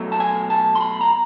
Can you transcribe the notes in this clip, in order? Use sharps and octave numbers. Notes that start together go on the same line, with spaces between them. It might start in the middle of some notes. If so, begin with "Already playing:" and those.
Already playing: B2 F#3 A3
A5
G#5
A5
C6
B5
A#5